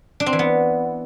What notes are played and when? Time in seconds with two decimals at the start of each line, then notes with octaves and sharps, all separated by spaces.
0.20 D4
0.26 C4
0.33 E3
0.39 B3